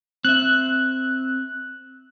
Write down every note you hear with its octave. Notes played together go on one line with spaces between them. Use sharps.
C4 E5 F#6